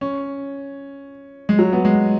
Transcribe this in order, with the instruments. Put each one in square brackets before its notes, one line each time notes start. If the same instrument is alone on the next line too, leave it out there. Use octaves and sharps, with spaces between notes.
[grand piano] C#4
G#3
F#3
B3
G#3